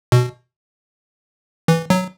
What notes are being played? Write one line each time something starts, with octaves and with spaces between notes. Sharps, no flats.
B2
E3
F#3